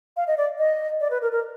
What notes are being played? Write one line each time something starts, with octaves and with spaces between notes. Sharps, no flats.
F5
D#5
D5
D#5
D5
B4
A#4
A#4